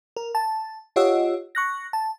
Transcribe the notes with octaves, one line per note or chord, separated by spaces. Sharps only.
A#4
A5
F4 G4 C#5 D#5 F#5 E6
C#6 F#6 A#6
A5